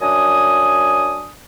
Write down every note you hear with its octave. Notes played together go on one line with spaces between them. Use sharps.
F#2 D4 G#5 D#6